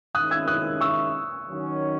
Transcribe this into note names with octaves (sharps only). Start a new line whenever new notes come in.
D#3 G#3 C#4 E4 D#6 F#6
E6 G#6
D#6 F#6
C#6 E6
D#3 F#3 C#4